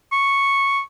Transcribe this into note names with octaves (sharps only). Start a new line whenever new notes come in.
C#6